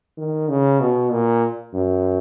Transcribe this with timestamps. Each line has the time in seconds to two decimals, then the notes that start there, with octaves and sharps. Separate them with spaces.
0.18 D#3
0.49 C#3
0.80 B2
1.11 A#2
1.74 F#2